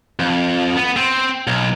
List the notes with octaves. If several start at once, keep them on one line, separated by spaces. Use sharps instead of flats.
F2
B3
C4
B1